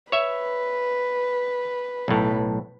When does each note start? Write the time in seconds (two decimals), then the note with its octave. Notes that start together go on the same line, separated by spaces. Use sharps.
0.12 B4 C#5 E5
2.08 B1 A2